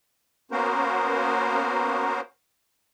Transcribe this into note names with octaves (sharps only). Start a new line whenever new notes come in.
A#3 B3 C#4 F#4 A#4 C5